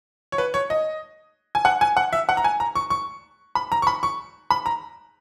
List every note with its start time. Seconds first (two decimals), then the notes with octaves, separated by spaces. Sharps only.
0.32 C#5
0.38 B4
0.54 C#5
0.70 D#5
1.55 G#5
1.65 F#5
1.81 G#5
1.97 F#5
2.13 E5
2.29 F#5
2.37 A#5
2.44 G#5
2.60 A#5
2.75 C#6
2.90 C#6
3.55 B5
3.72 A#5
3.82 C#6
3.87 B5
4.03 C#6
4.51 B5
4.66 A#5